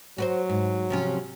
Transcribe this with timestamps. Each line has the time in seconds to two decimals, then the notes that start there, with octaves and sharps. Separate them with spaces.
0.18 F#3 F#4 B4 C5
0.49 G#2
0.90 C3 F3 C#4